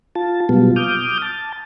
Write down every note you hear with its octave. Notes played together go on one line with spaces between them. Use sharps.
F4 A5
B2 F#3 G3 B3 F4
D6 D#6 F6 G6
A5